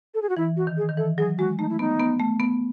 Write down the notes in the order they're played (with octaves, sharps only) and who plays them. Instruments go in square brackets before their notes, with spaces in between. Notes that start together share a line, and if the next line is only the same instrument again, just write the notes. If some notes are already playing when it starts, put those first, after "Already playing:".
[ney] A4
G#4
F#4
[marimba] E3 [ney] E4
[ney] F#4
[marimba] D#3
[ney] G#4
[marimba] D#3
[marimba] E3 [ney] A4
[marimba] F#3 [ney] G#4
[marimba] G#3 [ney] F#4
[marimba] A3 [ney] D#4
[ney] E4
[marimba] B3 [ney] D#4
[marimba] B3
A3
B3